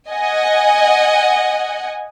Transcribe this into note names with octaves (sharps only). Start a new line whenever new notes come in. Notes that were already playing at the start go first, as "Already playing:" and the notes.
D#5 F#5 G#5